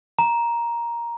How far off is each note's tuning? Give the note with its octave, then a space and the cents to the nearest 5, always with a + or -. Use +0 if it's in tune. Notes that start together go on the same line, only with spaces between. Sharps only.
A#5 +10